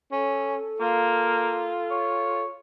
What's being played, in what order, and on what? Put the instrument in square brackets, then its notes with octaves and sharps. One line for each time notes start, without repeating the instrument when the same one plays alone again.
[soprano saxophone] C#4 [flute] A4
[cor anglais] A#3 [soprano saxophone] F4
[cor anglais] C#5